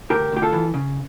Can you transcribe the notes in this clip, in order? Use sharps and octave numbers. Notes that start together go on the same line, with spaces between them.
D2 G4 A#4
D2 G4
F4 A4
E3
C#3